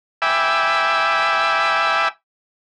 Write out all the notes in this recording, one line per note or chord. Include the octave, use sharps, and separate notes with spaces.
E5 G5 G#5 B5 D6 E6